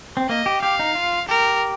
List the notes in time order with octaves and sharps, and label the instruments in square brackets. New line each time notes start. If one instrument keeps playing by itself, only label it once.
[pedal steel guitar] C4
[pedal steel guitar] A#3 [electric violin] D#5
[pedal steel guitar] G4
[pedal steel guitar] G4 [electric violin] F5
[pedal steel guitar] D#4
F4
[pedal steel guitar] G4 [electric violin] A#4